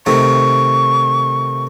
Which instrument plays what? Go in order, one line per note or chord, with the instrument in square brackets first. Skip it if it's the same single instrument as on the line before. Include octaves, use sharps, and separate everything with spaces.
[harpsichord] C3 D#3 A3 [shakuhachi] C#6